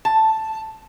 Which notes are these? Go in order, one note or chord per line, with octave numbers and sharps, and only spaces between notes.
A5